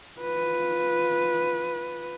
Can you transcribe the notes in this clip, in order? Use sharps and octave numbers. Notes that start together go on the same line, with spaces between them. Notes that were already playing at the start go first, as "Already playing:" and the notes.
F4 B4